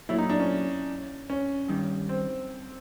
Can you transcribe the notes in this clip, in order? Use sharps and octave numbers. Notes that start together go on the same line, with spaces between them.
A#2 F#3 A3 E4
D#4
D4
C#4
C#4
G2 D#3 G3
C4